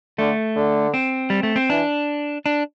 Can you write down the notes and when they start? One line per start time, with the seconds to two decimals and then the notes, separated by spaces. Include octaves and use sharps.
0.18 D3 A3
0.56 D3
0.94 C4
1.30 G3
1.43 A3
1.56 C4
1.69 E3 D4
2.46 D4